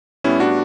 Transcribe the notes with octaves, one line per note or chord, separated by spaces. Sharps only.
A2 G3 B3 C#4 E4
D4 F#4